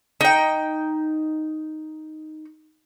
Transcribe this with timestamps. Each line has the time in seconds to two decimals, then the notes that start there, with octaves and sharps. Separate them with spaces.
0.21 D#4 G5